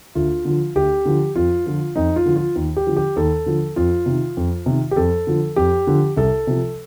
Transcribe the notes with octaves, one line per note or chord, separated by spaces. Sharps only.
D2 F4
D3 F3
D2 G4
D3 F3
F2 F4
D3 F3
F2 D#4
F4
D3 F3
F4
D#2
G4
D3 F3
G4
D#2 A4
D3 F3
F2 F4
C3 D#3
F2
C3 D#3
G4
F2 A4
D3 F3
F2 G4
D3 F3
C2 A4
C3 F3